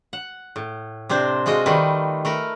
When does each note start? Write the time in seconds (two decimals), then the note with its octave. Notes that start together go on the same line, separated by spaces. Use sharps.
0.13 F#5
0.56 A2
1.09 C3 C4 D4 C5
1.46 G#3 F4 F#4 D#5
1.66 D#3 G3 A3 B4
2.25 A3 A#4 B4